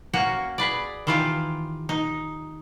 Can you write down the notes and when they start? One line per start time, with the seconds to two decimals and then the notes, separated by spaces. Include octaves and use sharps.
0.13 A#3 C#4 F#4
0.58 G#4 B4 D5
1.07 D#3 E3 F4 G4 F5
1.89 D#4